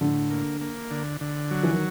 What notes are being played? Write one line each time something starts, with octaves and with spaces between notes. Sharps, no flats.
A2 D3
A#3
A#3
D3
D3
F#3
E3
D#3